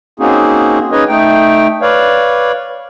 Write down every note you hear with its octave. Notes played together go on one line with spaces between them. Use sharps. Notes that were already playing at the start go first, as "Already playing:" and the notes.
A#3 C4 C#4 D#4 F#4 G#4
C#4 D#4 G#4 B4 C#5 D#5
A3 D#4 G5
B4 C#5 D5 F5